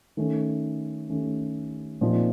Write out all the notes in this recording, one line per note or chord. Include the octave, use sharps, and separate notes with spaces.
D#3 A3 C#4
D#3 A3 C#4
A#2 F3 C4 D#4